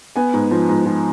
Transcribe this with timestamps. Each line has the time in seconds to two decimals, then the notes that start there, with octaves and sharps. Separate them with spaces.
0.16 B3 G#5
0.33 G#2
0.51 F3
0.69 G#2
0.86 F3